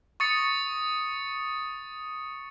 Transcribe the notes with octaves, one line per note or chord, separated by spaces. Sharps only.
C#6 D#6 A6 C#7